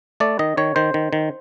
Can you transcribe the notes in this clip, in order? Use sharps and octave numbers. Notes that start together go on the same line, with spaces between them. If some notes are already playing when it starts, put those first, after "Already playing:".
A3 D5
D#3 D#5
D#3 C#5
D#3 C5
D#3
D#3